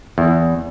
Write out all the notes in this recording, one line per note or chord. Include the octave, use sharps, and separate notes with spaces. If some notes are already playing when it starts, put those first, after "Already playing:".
E2